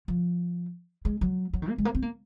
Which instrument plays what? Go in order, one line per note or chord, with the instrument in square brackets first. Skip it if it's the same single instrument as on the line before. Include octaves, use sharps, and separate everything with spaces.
[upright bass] F3
G#3
F#3
F#3
D#3
A#3
G#3
A#3
C4
A#3